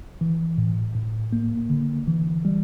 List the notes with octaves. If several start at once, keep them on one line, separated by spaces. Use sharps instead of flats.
E3
A2
A2
A#3
D3
E3
G3